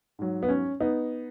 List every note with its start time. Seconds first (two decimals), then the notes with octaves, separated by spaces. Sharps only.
0.19 G#2 F#3
0.43 B3
0.49 C#4
0.80 B3 D#4